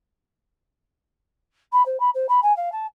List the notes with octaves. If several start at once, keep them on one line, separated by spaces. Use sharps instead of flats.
B5
C5
B5
C5
B5
G#5
F5
A5